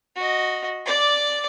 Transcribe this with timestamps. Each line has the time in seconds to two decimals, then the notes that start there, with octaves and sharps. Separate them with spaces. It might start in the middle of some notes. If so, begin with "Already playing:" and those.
0.16 F#4 D#5
0.85 D5 D6